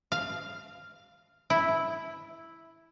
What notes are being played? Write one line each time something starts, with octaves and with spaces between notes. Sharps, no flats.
F5
E4